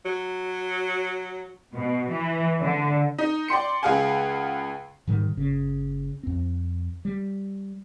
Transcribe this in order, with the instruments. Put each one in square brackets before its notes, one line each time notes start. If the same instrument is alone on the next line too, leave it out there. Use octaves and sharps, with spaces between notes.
[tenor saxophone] F#3
[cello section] B2
E3
D3
[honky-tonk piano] D#4
D5 G5 C6 C#7
C#2 G#4 F5 F#5 G#5
[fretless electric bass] G#2 B2 D#3 G3
F#1 C#3
F2 C4
G3